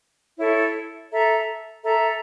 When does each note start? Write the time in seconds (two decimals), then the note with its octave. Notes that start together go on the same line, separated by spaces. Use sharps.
0.38 E4 A4 C#5
1.11 A4 E5 A#5
1.83 A4 E5 A#5